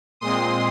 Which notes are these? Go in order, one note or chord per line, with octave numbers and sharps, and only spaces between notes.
A#2 G#3 C4 C6 D#6